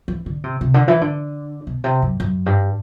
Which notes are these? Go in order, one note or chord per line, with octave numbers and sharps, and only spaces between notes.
E3
D3
C3
C3
D3
E3
D3
B2
C3
F#2
F#2
G2